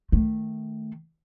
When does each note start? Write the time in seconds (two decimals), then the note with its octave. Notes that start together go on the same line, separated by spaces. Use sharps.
0.12 D#3 A3